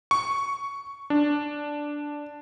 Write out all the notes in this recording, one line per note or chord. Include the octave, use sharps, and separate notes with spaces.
C#6
D4